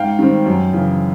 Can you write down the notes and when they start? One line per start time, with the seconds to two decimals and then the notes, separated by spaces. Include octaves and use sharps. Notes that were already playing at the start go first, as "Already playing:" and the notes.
Already playing: G#2 F5 G5
0.19 D#3 G3 C4
0.46 F#2
0.73 C#3 E3